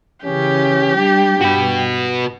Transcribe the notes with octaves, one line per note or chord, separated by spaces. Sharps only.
C#3 E3 C#4 G4
G3 D4 G5
G2 F#4 B4